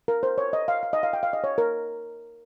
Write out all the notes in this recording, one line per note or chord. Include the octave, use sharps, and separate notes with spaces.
A#4
C5
C#5
D#5
F5
F5
D#5
F5
G5
F5
D#5
C#5
A#4